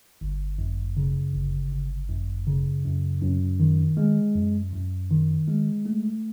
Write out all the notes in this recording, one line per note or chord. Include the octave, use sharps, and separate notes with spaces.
G1
F#2
C#3
G1
G1
F#2
C#3
F#2
F#2
D#3
G#3
F#2
F#2
D#3
G#3
A3